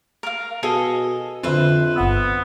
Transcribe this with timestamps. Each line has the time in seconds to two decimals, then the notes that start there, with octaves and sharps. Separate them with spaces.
0.23 A#4 F5
0.63 B2 G#4 A4 D#5
1.43 F2 D3 F4 B4 C5 E5
1.96 G1 B3 F#5 E6